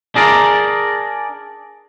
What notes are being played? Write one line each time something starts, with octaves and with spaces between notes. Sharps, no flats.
D4 G#4 A#4 D5